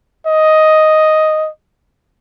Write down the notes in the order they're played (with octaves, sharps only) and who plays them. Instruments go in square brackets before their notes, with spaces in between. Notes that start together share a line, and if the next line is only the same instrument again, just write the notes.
[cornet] D#5